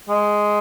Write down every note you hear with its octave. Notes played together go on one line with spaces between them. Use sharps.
G#3